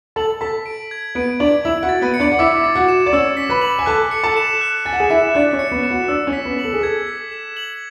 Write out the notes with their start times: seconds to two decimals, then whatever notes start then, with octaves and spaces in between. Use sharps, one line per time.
0.16 A4 A5 F#7
0.41 A4 A5 B6
0.66 D7
0.91 G#6
1.15 B3 B4 D7
1.40 D4 D5 F#7
1.65 E4 E5 F#7
1.83 F#4 F#5
1.89 A6
2.02 B3 B4
2.14 C#7
2.20 D4 D5
2.32 F#5
2.39 E4 E5 D6
2.64 A6
2.75 F#4 F#5
2.88 E7
3.06 D5
3.13 C#4 C#5 E6
3.37 B6
3.49 B4 B5
3.61 F#7
3.79 G#5
3.86 A4 A5 F#6
4.11 C#7
4.24 A4 A5
4.37 E7
4.61 F#6
4.85 G#5 A6
4.93 F#5
5.00 G#4 G#5
5.10 E4 E5 E7
5.35 D4 D5 F#6
5.53 C#4 C#5
5.59 C#7
5.71 B3 B4
5.83 E7
5.90 F#4 F#5
6.08 D4 D5 E6
6.27 C#4 C#5
6.33 B6
6.45 B3 B4
6.59 F#7
6.64 A4
6.73 G#4
6.81 A4 G#6
7.07 B6
7.32 E7
7.57 F#7